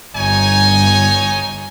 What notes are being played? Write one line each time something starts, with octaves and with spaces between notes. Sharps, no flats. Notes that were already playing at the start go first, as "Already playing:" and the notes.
G1 D#4 C#5 G#5